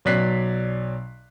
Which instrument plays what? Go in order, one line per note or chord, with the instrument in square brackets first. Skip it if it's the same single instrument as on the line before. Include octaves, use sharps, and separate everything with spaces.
[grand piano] B1 F#3 D5 F#6 B6 C7